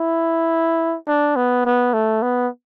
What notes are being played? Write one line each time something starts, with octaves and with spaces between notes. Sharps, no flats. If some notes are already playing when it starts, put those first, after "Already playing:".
Already playing: E4
D4
B3
B3
A3
B3